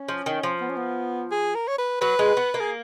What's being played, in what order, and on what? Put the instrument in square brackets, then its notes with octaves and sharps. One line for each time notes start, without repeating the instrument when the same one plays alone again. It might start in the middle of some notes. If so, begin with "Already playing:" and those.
Already playing: [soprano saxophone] C#4
[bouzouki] F3
D#3
F3
[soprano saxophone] B3
C#4
B3
G#4
A#4
C#5
B4
[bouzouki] F#3 [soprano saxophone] B4
[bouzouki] G#3
B3
A#3
[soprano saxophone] G#4